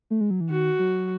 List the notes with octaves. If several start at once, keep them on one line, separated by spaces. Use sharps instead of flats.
A3
G#3
F#3
E3
D#3 F#4
F#3